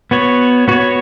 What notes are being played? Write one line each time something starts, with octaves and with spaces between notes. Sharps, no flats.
B3 F#4 C#5
B3 F#4 C#5